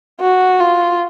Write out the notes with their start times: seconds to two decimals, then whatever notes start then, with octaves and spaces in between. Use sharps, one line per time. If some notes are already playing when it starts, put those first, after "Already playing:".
0.21 F#4
0.60 F4